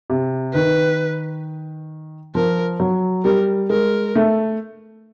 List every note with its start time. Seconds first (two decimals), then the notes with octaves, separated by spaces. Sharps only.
0.10 C3
0.54 D#3 B4
2.35 F3 A#4
2.80 F#3
3.25 G3 A#4
3.70 G#3 A#4
4.16 A3